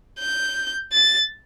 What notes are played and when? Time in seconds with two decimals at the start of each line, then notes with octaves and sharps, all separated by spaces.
0.20 G6
0.92 A6